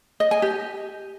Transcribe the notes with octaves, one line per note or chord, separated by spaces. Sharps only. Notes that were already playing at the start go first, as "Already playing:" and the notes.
D#5
G#5
G4